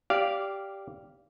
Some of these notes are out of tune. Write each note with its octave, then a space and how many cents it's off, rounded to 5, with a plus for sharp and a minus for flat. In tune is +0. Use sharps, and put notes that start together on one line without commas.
G4 +0 D5 -15 F5 -10